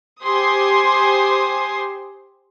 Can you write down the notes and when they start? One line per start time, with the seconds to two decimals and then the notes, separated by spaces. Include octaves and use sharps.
0.22 G4 C5 G#5 C6 D#6